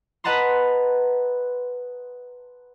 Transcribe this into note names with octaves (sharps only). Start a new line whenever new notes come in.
B4 D#5 F#5 A5 A#5 C6